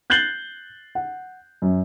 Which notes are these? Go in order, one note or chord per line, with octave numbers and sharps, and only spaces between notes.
F#6 G6 A6 C7 F#7 G7
F#5
F#2